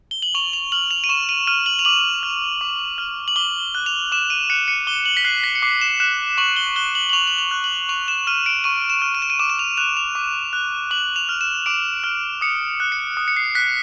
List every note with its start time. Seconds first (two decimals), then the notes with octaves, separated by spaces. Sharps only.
0.11 G7
0.22 F#7
0.35 C#6 F7
0.53 F7
0.72 F6 F#7
0.91 F7
1.04 D#7
1.09 C#6 E7
1.29 D#7
1.47 F6 D#7
1.66 F#7
1.79 F7
1.85 D6 F#7
2.23 F6
2.61 D6
2.98 F6
3.28 F#7
3.36 D6 G7
3.75 F#6
3.86 F7
4.12 D6 E7
4.30 D#7
4.50 F#6 C#7
4.68 C#7
4.87 D6 G7
5.06 F#7
5.17 B6
5.24 F#6 C7
5.44 B6
5.55 C#7
5.62 D6 C7
5.81 E7
6.00 F#6 E7
6.38 C#6 F#7
6.56 G7
6.76 F#6 G7
6.95 F#7
7.10 F#7
7.13 C#6 F7
7.27 F#7
7.38 F7
7.51 F#6
7.64 F#7
7.89 C#6 F7
8.08 E7
8.27 F6 D#7
8.46 D7
8.64 C#6 D#7
8.90 E7
9.02 F6
9.15 D#7
9.22 E7
9.30 D#7
9.39 D6 E7
9.50 E7
9.59 F7
9.77 F#6 F7
9.97 F7
10.15 D6
10.53 F#6
10.91 D6 F#7
11.16 F7
11.29 F6
11.41 E7
11.66 D6 D7
12.04 F6
12.41 D#6 C#7
12.80 F#6
12.92 C#7
13.17 D#6
13.28 C#7
13.37 C7
13.55 F#6 B6